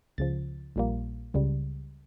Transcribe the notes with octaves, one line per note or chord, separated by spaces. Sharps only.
C#2 C#3 F3 A6
A#1 A#2 G3 A#3
C#2 C#3 G3